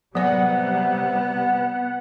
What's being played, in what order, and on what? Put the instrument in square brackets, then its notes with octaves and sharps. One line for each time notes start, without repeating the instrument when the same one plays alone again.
[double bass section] C3 G3 [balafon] F#3 D5 [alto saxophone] B3 [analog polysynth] F#5